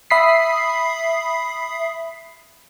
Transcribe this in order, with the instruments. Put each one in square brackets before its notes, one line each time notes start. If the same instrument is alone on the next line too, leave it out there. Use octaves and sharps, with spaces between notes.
[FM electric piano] E5 B5 D#6 B6 C7